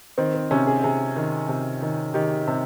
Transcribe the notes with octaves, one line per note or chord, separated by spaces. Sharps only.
D#3 C4
C4
C3 C#4
G#4
C3 G#4
D#3
C3
D#3
D#3 G4
C3